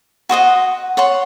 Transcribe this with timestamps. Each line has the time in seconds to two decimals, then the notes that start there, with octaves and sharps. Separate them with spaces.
0.29 F#4 C5 D#5 F#5
0.97 C#5 F#5 C6